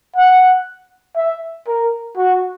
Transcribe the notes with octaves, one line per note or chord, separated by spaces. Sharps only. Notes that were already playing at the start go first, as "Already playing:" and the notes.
F#5
E5
A#4
F#4